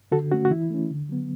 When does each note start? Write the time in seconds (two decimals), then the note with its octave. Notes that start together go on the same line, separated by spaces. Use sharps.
0.12 D3 F#4 A4
0.31 A3 C#4 F#4
0.45 F#4
0.50 E3 E4
0.71 A3 C#4
0.90 D3
1.09 F#3 B3